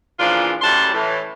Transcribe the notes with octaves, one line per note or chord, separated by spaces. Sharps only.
A#2 C#3 E3 F3 D4 F4
F#2 A2 G3 F#5 A5 C6
A2 E3